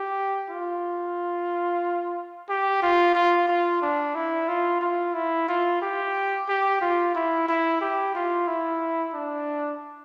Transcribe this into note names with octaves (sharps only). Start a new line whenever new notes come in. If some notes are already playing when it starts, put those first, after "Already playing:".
Already playing: G4
F4
G4
F4
F4
F4
D4
E4
F4
F4
E4
F4
G4
G4
F4
E4
E4
G4
F4
E4
D4